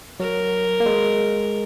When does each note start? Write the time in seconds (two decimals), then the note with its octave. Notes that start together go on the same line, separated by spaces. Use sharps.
0.20 F#3 A#4
0.80 A#3
0.86 G#3